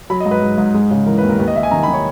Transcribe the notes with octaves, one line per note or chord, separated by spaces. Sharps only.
F#3 B5
D#5
G#2
B4
G#2
G#2
G#3
C#3
E3 A#4
B4
D#2
A#4
D#2 B4
D#5
D#2 E5
G#5
D#3 A#5
B5
D#3
C#5